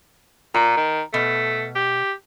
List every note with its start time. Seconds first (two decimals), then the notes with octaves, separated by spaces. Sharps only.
0.54 A#2 A#5
0.77 D#3
1.14 B2 A3
1.75 G4